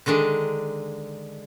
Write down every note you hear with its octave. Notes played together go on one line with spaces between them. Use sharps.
D3 D#3 G#3 D4